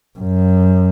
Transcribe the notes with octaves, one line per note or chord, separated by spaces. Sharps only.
F#2